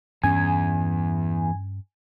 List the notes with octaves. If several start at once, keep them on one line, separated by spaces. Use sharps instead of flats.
E2 G2 C#4 G#5